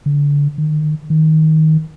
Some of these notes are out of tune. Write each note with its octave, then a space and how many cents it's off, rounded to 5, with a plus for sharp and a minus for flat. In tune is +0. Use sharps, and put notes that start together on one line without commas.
D3 -30
D#3 -30
D#3 +15